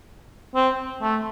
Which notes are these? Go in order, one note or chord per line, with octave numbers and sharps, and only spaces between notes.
C4
A3